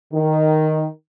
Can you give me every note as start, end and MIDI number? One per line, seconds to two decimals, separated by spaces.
0.13 0.85 51